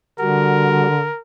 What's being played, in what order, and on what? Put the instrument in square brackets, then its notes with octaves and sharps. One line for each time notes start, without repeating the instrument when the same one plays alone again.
[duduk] D3 [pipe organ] G3 F#4 [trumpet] A#4